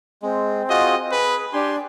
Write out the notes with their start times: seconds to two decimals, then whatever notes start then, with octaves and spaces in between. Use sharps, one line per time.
0.22 G#3 C4
0.70 F4 F#4 G#4 D#5
1.12 G#4 B4
1.53 D4 G4 G#5 C6